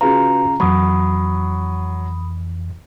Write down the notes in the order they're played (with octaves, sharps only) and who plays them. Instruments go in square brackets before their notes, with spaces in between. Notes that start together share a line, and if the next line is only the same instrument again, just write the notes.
[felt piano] C#3 F4 [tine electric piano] F#4 G#4 B4 [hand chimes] A#5
[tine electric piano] F2 E3 [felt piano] F#3 [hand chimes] B5 D#6